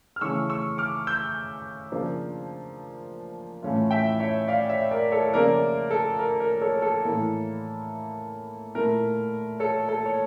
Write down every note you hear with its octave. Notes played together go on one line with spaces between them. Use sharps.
F6
C#3 E3 A3 C#4 C#6 E6
C#6 E6
D6 F6
E6 G6
C#3 F3 A#3 D4
A2 E3 A3 C#4 F4
E5 G5
C#5 E5
D5 F5
C#5 E5
A#4 D5
A4 C#5
C#3 F3 A#3 C#4 F4 A#4 D5
A4
A#4
A#4
A4 C#5
A4
A2 E3 A#3 E4
A#2 A3 E4 A#4
A4 C#5
A4
C#5